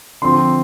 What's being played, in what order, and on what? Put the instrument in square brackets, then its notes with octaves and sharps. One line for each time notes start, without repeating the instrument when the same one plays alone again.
[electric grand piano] D3 F3 C4 [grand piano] C6